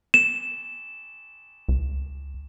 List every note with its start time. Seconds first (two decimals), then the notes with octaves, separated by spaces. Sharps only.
0.14 E7
1.69 C#2